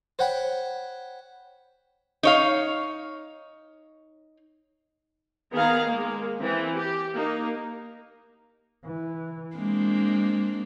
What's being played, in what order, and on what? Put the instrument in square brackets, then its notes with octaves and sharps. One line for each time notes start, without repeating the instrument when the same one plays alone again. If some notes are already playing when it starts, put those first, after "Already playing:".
[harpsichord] C5 C#5 F#5 G5 B5
[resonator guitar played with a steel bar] D#4 C#5 F5
[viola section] D#3 B3 G#4 F5 A#5
G#3 A#3
E3 C4
G4
A#3 D#4
[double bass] E3
[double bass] G#3 [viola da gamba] A#3 C4 D4